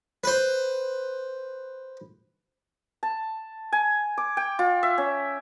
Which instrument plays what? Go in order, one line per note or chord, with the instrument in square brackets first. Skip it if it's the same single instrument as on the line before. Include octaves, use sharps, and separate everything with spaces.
[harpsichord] B4 C5
[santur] A5
G#5
D6
G5
F4
E5
C#4